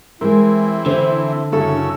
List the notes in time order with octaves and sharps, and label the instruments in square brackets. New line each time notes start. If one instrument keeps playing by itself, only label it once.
[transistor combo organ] E3 C4 [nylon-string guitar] G#3 A#4 [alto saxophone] E4
[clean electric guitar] D3 [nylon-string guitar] C5
[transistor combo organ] F#2 C#3 E6 [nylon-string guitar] E4 A4